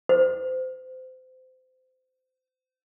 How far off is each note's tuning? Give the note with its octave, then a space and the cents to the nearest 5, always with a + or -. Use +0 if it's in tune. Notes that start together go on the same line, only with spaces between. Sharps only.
C5 -30